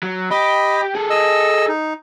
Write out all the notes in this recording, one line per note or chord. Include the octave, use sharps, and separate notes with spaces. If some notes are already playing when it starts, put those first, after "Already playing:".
F#3
G4 D#5 B5
G#4 A4
D#5 E6
D#4